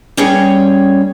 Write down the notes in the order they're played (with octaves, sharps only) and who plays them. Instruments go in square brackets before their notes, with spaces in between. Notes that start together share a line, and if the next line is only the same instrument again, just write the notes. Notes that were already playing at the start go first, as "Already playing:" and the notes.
[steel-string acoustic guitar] G3 A#3 C#4 G#4 C#5 G5